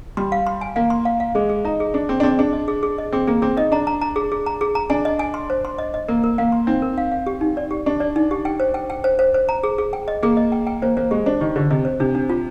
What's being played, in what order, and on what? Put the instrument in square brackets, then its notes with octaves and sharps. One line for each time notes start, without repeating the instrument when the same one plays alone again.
[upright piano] G3 [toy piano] C6
[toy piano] F5
C6
G#5
[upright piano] A#3 [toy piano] F5
[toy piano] C6
F5
F5
[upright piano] G#3 [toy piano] G#4
[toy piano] G#4
[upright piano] D#4 [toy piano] A#5
[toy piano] G#4
[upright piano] D4 [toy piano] G#4
[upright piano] C4 [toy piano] G#4
[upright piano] D4
[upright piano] C4 [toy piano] G#4
[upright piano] D4 [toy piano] G#4
[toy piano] D#5
G#4
G#4
D#5
[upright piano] C4 [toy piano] G#4
[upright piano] A#3 [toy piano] G#4
[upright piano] C4 [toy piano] G#4
[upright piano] D#4 [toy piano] D#5
[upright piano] D4 [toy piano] A#5
[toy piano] A#5
A#5
G#4
G#4
A#5
G#4
A#5
[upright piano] D4 [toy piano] G#5
[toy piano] D#5
G#5
C6
C5
C6
D#5
D#5
[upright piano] A#3 [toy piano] A#4
[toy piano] A#4
[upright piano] A#3 [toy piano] F5
[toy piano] C6
[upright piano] C4 [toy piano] D#4
[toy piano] A#4
F5
F5
G4
D#4
D5
G4
[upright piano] D4 [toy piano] G4
[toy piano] D5
D#4
G4
G5
C5
G5
G5
C5
C5
C5
A#5
G#4
G#4
G5
D#5
[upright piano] A#3 [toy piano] G#4
[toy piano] D#5
G5
G5
[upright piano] A#3 [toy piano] C5
[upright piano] A#3 [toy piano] C5
[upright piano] G#3 [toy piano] G4
[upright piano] D4 [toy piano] C5
[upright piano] D#3 [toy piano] G4
[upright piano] D3 [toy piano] G4
[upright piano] C3 [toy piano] D#5
[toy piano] C5
[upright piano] C3 [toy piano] D4
[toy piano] D4
F4